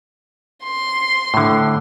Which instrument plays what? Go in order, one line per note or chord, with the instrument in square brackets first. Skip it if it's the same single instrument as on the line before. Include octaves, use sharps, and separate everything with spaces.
[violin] C6
[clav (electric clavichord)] A2 D3